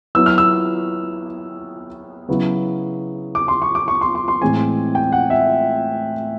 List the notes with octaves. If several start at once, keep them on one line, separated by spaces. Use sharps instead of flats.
F#3 B3 E4 E6
F6
E6
C#3 F#3 B3 E4
D6
C6
C#6
D6
C#6
C6
C6
C6
A2 E3 G#3 C4 G#5
G5
F#5
E5